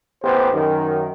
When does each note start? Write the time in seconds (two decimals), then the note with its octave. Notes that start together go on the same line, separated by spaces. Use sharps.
0.23 A1 B3 G4 C5
0.52 F#2 D#3